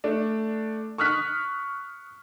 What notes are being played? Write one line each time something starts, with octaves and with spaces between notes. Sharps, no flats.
A3 D4
C#6 D#6 F6 F#6 B6